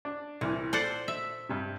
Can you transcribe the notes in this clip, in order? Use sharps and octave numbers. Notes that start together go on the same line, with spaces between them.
D4
C2 A#2 E3
A4 C5 D5 F#5
E5
G2 C3